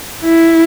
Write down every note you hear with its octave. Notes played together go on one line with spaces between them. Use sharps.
E4